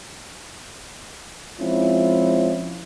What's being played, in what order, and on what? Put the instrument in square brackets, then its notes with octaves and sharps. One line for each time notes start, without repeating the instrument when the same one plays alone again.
[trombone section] F3 G#3 C4 C#4 E4 F4